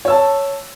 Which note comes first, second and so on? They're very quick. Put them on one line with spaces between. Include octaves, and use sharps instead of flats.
C#5 E6 A5